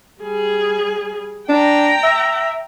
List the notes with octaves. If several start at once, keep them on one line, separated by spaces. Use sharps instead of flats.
G3 G#4
D4 G5 A#5
E5